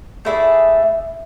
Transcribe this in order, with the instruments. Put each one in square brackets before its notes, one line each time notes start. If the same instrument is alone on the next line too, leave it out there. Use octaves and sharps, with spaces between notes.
[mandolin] A3 E4 G#4 D5